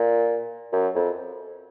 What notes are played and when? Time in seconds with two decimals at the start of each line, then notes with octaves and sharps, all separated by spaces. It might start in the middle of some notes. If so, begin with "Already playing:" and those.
Already playing: A#2
0.72 F#2
0.95 F2